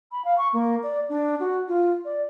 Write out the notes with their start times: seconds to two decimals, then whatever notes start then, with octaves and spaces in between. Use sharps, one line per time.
0.12 B5
0.25 F5
0.38 C#6
0.53 A#3
0.83 D5
1.09 D4
1.40 F#4
1.68 F4
2.05 D5